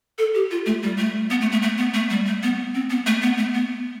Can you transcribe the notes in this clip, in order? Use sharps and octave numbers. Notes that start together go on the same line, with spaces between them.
A4
G4
F4
A3
G3
A3
B3
A3
A3
A3
B3
A3
G3
A3
B3
C4
B3
A3
B3
A3
B3